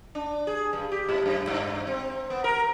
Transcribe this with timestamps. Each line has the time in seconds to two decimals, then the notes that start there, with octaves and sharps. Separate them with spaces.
0.15 D4
0.47 G#4
0.73 G2
0.92 G4
1.09 G#2
1.26 F#2
1.47 G2
1.87 C4
2.30 B3
2.44 A#4